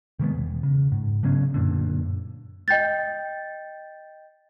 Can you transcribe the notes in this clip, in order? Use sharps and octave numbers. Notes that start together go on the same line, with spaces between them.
C3 D#3 G#3 B3
E1
C#3
G#2
C#3 F#3 B3 C#4
F#2 A#2 D3
D#5 G5 G6 A6